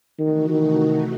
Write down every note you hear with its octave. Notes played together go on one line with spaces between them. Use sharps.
C3 D#3 E3 A3 D#4 F#4
D#3